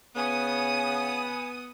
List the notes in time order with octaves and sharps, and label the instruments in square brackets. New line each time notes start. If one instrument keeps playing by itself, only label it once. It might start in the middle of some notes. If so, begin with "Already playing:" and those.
[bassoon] C#3 [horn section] B3 [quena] G#5 [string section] D#6